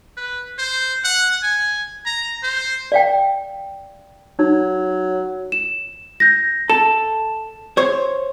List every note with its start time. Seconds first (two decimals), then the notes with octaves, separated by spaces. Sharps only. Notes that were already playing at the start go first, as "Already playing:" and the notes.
0.17 B4
0.58 C5
1.04 F#5
1.43 G#5
2.06 A#5
2.43 C5
2.92 D5 F5 G5
4.39 F#3 D#4
5.52 E7
6.20 G6 A#6
6.70 A4 E7
7.77 C5 C#5